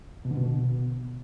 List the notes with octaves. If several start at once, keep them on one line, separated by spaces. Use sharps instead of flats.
B2
D3
B2